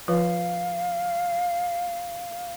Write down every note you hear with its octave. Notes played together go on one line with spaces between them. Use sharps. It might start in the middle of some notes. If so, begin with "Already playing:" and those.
F3 F4 B4 F5